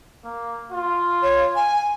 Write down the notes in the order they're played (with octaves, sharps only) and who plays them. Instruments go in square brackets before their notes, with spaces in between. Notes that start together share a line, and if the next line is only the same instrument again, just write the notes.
[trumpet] A#3
F4
[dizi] C#5
G#5